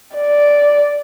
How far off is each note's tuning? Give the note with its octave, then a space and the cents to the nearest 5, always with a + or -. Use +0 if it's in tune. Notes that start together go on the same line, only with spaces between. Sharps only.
D5 -5